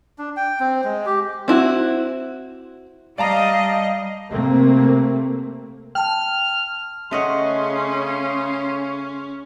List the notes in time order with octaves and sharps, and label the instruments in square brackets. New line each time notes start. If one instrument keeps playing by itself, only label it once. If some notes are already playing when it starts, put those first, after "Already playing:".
[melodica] D4
G5
C4
G#3
G4
[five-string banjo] C4 E4 F#4
[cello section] G3 D#5 [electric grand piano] D5 A5 A#5 [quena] F5
[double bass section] C3 A3 A#3 C4
[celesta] G5 A5 [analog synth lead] F6
[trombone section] C#3 [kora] A3 D#5 F#5 [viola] C#4 [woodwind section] C6